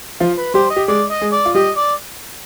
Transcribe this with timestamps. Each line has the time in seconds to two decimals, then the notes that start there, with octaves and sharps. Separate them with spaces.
0.20 F3 F4
0.38 B4
0.54 G3 G4 C5
0.71 D#5
0.76 G4
0.88 G#3 G#4 D5
1.10 D#5
1.21 G#3 G#4
1.33 D5
1.46 F4
1.55 G3 G4 D#5
1.77 D5